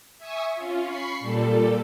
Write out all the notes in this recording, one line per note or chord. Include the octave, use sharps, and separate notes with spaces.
E5 G#5 C#6 D#6
C#4 F4
B5 C#6 C7
A#2 G3 A4